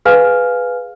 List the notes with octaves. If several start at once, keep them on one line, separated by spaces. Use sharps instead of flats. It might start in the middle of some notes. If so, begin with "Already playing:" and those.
G#4 B4 F5 G#5 F6